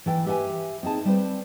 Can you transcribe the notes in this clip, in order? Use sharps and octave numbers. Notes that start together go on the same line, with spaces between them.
E3 A4 G5
G4 B4 E5 F#5 G#5
C4 D#4 G#4 A5
G3 C4 B4 C5